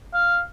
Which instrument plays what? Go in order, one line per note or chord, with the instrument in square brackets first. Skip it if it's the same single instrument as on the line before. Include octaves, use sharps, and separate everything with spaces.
[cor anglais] F5